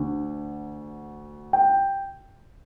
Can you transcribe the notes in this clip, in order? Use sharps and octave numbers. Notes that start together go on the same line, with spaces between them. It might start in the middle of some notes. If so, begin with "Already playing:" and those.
Already playing: D2 D3
G5